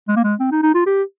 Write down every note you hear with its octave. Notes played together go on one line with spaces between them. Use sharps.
G#3
A#3
G#3
C4
D#4
D#4
F4
G4